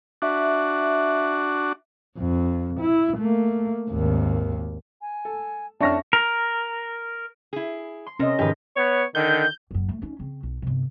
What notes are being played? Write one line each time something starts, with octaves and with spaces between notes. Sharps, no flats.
D4 F#4 E5
F2
E4
A3 A#3
G#1 D#2
G#5
A4
F2 C#4 D4 E5 A5 C#6 F6 A#6
A#4
E4 G#4
C6
C3 C4 C#4 A#4 D#5
F1 G#2 D#3 G4 B4
B3 C#5
D3 D#3 G6
F#1 F#2
A3
C#4 D#4
C#3 C4
B1
G1 C3